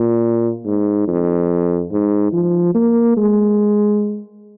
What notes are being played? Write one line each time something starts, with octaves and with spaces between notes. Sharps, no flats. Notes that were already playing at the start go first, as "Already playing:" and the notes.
Already playing: A#2
G#2
F2
G#2
F3
A#3
G#3